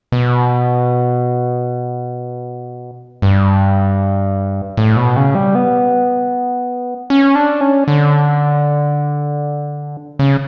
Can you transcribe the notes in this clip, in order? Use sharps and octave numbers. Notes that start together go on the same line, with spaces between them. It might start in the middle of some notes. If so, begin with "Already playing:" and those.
B2
G2
A2
B2
C#3
G3
B3
C#4
D4
C#4
D3
C#3